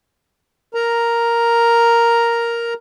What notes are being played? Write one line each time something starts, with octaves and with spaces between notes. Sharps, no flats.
A#4 A#5